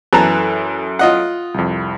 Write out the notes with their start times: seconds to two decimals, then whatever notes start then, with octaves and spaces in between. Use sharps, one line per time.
0.13 F#2 E3 A4 A5 A#5 F#6
0.99 F4 D#5 F#5
1.54 C2 F2